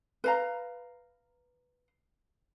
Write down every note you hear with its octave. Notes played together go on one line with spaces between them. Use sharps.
B4 F5 A#5